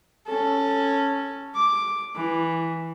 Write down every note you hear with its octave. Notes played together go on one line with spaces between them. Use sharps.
C#4 A4
D6
E3